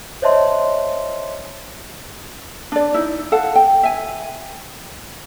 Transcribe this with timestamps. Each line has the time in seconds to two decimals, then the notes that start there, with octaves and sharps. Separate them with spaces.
0.22 C5 C#5 D#5 E5 A5 C6
2.72 D4 D5
2.94 D#4 E4
3.32 A4 F5 F#5 A5
3.55 G5
3.83 E5 G#5